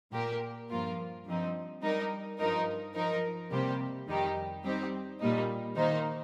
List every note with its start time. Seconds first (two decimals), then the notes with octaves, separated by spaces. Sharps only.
0.13 A#2 A#3 G4 A#4
0.70 G2 F3 A#3 F4 A#4
1.26 G2 F3 C4 D#4
1.82 G3 D#4 A#4
2.38 G2 F3 D#4 A#4
2.95 F3 D#4 A#4
3.51 C3 G3 A#3 G4 C5
4.07 F2 D#3 G3 D#4 G4
4.64 G3 C4 D#4 G4 C5
5.20 A#2 G3 A#3 D#4
5.76 D#3 A#3 D#4 C5